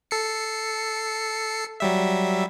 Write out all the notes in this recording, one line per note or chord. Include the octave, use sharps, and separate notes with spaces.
A4 C7 C#7
F#3 G3 E5